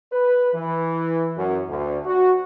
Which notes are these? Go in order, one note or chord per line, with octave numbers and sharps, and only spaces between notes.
B4
E3
F#2
D2
F#4